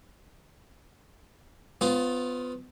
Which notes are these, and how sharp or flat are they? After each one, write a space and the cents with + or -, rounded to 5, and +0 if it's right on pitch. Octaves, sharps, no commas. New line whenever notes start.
B3 +25 F4 +0 C5 +35